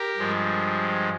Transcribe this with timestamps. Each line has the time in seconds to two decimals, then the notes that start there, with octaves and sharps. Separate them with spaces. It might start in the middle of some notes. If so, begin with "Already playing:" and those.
Already playing: G4 A#4
0.17 G2 F3 G#3